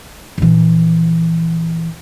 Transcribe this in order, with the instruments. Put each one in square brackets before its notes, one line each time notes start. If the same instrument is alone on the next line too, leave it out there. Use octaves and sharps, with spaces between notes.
[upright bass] A#1 E3